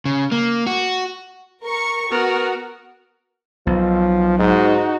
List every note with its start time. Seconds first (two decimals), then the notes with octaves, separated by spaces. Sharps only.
0.05 C#3
0.32 A#3
0.67 F#4
1.64 A#4 C#6
2.11 B3 F#4 A#4
3.67 B1 F3
4.39 G#2 D#4 F#4